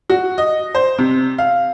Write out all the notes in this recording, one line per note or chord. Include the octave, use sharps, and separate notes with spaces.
F#4
D#5
C5
C3
F5